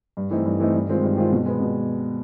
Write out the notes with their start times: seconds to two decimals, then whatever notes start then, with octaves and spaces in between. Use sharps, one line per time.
0.17 G2
0.31 E3 A3 C4 D#4
0.45 G2
0.60 E3 A3 C4 D#4
0.74 G2
0.89 D#3 G#3 C4 F4
1.03 G2
1.17 D#3 G#3 C4 F4
1.32 B2
1.46 G#3 B3
1.61 B2